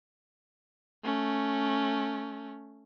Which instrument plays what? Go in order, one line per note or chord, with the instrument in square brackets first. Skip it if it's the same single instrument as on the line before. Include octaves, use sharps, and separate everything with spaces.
[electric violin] A3 C#4